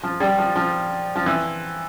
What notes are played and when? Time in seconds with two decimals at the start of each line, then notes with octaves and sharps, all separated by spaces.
0.03 F3
0.20 G3
0.38 F3
0.56 F3
1.15 F3
1.26 E3